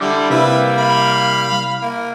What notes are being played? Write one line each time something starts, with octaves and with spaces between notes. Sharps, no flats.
D3 G3 E4 D6
C3 A#3 E4 B4 E5
F5 B5
A#3